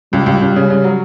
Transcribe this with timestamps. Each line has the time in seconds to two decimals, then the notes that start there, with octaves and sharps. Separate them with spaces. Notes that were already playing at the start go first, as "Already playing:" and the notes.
0.13 C#2 G3
0.26 C#2
0.42 C#2
0.56 C#3
0.70 C#3
0.84 F#3